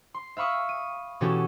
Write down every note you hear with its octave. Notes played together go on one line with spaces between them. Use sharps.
C6
E5 F5 B5 C#6 D#6
D#7
B2 E3 C#4 F#4 G4 A4